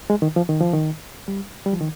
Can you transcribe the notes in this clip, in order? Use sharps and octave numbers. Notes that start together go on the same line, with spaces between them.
G#3
D#3
F3
D#3
F3
D#3
G3
G3
F3
D#3